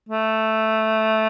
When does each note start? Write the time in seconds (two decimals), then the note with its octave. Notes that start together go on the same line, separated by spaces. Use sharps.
0.09 A3